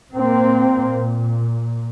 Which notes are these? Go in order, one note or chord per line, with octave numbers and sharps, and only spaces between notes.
A#2 A#3 C4